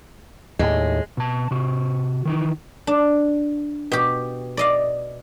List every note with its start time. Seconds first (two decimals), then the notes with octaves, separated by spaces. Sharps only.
0.59 D#2 A2 G#3
1.17 B2 A5
1.51 C3 F#4
2.25 D#3 E3 D#4
2.87 D4
3.92 B2 G4
4.57 D5 D#5 F5